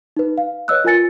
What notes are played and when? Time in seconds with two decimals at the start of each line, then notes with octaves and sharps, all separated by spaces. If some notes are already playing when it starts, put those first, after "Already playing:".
0.17 D#4 B4
0.38 F5
0.68 B4 C#5 D#5 E6 F#6
0.84 F4 A#4 G#5 A6 C#7